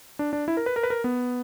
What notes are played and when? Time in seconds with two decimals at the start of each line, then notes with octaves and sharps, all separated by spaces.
0.19 D4
0.33 D4
0.48 E4
0.57 A#4
0.66 B4
0.76 A#4
0.83 B4
0.90 A#4
1.04 B3